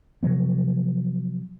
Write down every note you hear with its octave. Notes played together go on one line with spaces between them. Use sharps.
C3 F3 F#3 B3